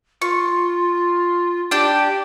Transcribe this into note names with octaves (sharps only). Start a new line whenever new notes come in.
F4 C#6
D4 G4 G5